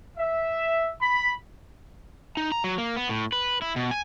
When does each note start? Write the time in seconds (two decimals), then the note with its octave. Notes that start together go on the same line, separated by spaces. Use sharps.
0.17 E5
1.01 B5
2.37 D#4
2.52 A#5
2.64 F#3
2.78 A#3
2.97 B3
3.09 A2
3.32 B4
3.62 E4
3.76 B2
3.91 G#5